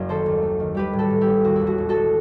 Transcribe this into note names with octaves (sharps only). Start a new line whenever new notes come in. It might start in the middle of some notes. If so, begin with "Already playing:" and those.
Already playing: F#1 F#2
D#3 A4 C5
D#2
A3
D#3
G3 G4 B4
A2
F#4 A4
A2
E4 G4
A1
D#2 F#4
E4
E1
F#4
E1
F#4 A4
E1